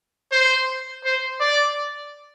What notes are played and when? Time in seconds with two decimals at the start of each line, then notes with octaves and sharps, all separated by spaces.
0.32 C5
1.05 C5
1.40 D5